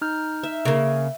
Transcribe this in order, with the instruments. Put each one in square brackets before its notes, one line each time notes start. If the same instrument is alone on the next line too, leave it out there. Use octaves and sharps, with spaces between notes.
[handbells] D#4 F6 G6
[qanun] E5
[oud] C#3 A#3